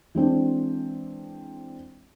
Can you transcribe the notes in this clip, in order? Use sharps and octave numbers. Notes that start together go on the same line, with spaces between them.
E3 G#3 C4 D4